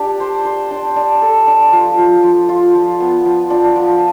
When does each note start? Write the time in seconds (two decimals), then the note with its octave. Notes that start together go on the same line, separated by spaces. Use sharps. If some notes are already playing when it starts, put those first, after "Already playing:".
Already playing: D4 G4
0.20 C5
0.45 C5
0.71 D4
0.96 D4
1.22 A4
1.47 D4
1.72 F3
1.98 F3
2.23 F3
2.49 F4
2.75 F3
3.00 B3
3.25 F3
3.50 D4
3.76 F3